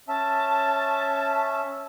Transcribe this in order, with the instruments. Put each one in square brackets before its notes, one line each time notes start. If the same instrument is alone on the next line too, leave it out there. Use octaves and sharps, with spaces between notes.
[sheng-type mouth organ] C#4 E5 [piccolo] A5